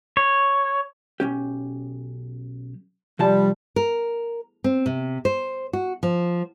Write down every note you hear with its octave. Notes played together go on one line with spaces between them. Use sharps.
C#5
B1 C#4 G4
C3 F3 G3 A5
A#4
C4
C3
C5
F#4
F3